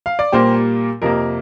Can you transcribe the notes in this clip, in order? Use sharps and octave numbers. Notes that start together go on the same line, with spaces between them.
F5
D5
A#2 G3 A#3 G4 C5
F2 C3 A#3 A#4